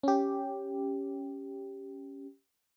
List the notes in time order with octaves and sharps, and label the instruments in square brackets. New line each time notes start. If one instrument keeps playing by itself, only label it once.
[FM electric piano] C#4 G4